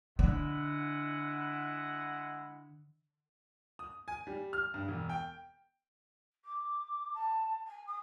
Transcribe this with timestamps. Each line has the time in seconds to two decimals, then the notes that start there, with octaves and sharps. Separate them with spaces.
0.19 D3 G#3 E4 F#5
3.79 D#6
4.08 G#5
4.27 G3
4.53 F6
4.74 G2
4.88 E1
5.09 G5
6.44 D6
7.13 A5
7.66 G#5
7.86 D#6